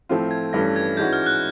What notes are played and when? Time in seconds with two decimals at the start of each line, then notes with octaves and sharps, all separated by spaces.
0.09 A2 F3 A3 C4 F4
0.31 G#6
0.53 G2 E3 A3 C#4 A#6
0.76 G#6
0.97 G#2 E3 G#3 C#4 F#4 G6
1.13 F6
1.26 F#6